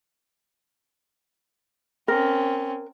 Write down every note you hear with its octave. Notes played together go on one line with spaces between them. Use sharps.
C4 C#4 A#4